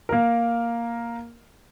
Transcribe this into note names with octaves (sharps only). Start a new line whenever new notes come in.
A#3 A#4